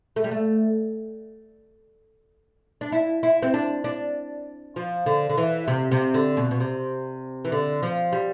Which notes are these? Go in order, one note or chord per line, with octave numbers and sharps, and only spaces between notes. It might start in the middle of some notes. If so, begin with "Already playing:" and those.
A3
G3
A3
D4
E4
E4
C4
D4
D4
F3
D3
D3
E3
C3
C3
D3
B2
B2
C3
E3
D3
F3
G3